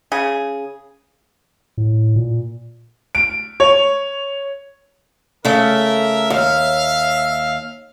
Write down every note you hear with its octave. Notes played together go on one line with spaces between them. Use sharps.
C#3 G#4
A2
A#2
D7
C#5
C#3 A3 A#4 E5
D#2 E5 F5